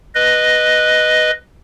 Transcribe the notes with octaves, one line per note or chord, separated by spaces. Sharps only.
B4 D#5